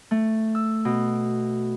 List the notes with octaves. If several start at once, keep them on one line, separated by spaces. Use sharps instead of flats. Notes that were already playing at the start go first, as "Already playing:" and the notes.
A3
E6
B2